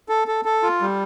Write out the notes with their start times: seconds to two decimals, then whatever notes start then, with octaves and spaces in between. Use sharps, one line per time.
0.09 A4
0.28 A4
0.45 A4
0.63 F4
0.82 G3